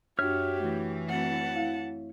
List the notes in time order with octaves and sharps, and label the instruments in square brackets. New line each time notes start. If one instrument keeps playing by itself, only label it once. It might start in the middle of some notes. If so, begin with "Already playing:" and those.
[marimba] F#2 D4 [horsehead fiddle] F#4 G4 [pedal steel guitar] C#5 E5 F6
[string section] E3 [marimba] A3
[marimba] A3 C4 F#4 [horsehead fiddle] F#5 A5
[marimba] E4 F5